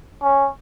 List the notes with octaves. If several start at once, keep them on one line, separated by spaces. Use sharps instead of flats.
C#4